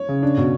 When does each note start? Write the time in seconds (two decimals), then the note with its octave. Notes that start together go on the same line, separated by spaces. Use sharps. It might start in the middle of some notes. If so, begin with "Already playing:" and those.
Already playing: C#5
0.09 C#3
0.23 D4
0.37 B2